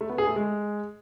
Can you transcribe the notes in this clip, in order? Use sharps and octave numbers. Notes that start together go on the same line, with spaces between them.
A3
B3
G#4
A3
G#3